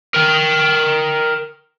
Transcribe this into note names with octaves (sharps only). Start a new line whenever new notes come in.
A#4 G5